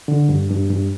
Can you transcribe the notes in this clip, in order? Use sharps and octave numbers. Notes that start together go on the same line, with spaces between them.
D3
G2
G2
G2